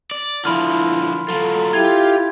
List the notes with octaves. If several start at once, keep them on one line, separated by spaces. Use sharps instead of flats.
D5
D3 F3 E4 B5 C6 F6
F#3 F4 A4
E4 F4 G4 G#6